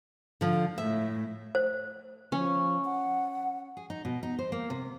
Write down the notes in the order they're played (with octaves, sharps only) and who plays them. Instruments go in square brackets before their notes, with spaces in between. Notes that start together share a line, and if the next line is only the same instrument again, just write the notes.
[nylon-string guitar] D3 F3
[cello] A2 [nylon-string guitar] E5
[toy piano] C5
[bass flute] F3 [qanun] C#4
[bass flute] F#5
[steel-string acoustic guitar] G#4
D#4
B2
D#4
C5
A#3
C3